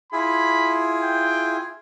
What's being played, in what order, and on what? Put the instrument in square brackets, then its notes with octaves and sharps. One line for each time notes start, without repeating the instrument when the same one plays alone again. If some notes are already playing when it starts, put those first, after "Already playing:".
[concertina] E4 F4 G#4 [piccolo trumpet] B5
[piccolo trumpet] G5